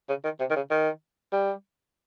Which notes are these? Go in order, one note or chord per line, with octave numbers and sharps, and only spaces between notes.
C#3
D#3
C3
D#3
C#3
D#3
G3